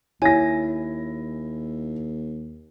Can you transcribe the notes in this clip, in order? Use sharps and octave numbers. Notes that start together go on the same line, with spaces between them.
D#2 E4 C#5 G#5 A#6